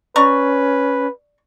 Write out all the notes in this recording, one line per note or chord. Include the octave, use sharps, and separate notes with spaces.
C#4 B4 D5 A#5 C#6